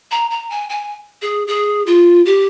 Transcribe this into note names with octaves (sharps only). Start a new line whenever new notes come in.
A#5
A#5
G#5
G#5
G#4
G#4
F4
G4